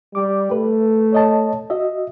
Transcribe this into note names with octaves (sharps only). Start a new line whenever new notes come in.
G3 D6
A3 B4
C#5 D#5 A5
F#4 D#5 E5